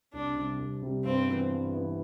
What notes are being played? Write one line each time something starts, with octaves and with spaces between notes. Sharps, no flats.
C2 D4
C3 G3
C2
C3 G3
G2 C4
E3 B3 E4
G2
E3 B3 E4